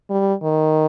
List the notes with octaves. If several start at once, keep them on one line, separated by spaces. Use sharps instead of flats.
G3
D#3